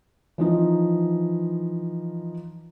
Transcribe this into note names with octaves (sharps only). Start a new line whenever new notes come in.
E3 F3 D#4